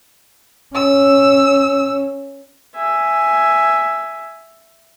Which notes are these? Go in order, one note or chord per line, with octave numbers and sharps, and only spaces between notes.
C#4 E6
E5 G#5